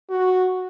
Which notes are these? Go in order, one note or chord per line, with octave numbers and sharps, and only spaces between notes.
F#4